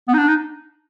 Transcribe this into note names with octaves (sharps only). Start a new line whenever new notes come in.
B3
D#4
D4
D#4